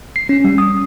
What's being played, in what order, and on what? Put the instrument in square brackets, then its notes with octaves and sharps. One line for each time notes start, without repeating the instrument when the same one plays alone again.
[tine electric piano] C7
C#4
G3
D#6